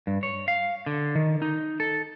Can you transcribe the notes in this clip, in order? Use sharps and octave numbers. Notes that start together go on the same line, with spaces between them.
G2
C#5
F5
D3
D#3
D#4
A4